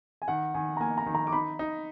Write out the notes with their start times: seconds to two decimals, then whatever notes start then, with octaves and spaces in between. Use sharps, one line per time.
0.22 G#5
0.28 D#3 F#5
0.54 D#3 G#5
0.77 A#5
0.80 A#3 G#5
0.98 A#5
1.06 D#3
1.15 A#5
1.27 D6
1.32 D#4 B5
1.59 D#4